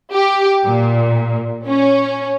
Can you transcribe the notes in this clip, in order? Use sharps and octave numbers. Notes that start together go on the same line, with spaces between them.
G4
A#2
C#4